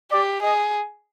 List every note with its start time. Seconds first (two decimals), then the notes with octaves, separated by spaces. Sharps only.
0.12 G4 D5
0.42 G#4 D#5